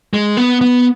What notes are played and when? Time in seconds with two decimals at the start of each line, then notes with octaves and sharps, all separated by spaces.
0.13 G#3
0.37 B3
0.61 B3